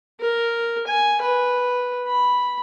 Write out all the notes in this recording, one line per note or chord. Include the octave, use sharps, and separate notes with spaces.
A#4
G#5
B4
B5